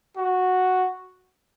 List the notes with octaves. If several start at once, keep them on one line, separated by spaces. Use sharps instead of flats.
F#4